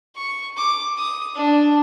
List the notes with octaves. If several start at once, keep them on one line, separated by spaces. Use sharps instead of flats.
C#6
D6
D#6
D4